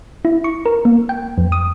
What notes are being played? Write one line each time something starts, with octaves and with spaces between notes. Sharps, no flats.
E4
C#6
A#4
A#3
G5
F2
D#6